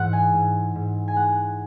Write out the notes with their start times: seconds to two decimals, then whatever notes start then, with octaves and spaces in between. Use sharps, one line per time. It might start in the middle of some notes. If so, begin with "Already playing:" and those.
Already playing: G#2 E3 E4 F#5
0.13 G#5
0.34 G#2
0.75 G#2
1.08 G#5
1.16 G#3 F#5